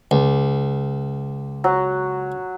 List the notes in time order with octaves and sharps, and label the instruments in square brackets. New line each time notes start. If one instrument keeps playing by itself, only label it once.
[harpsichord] C#2
[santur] F#3